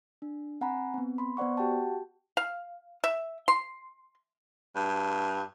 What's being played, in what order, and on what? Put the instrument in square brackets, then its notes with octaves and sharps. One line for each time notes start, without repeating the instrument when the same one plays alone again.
[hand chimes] D4
C4 F#5 G#5 A#5 B5
B3 C4
B5 C6
B3 C5 D5 F#5 C#6
F#4 G4 F#5 G5 A5
[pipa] F5
E5
C6
[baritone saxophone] G2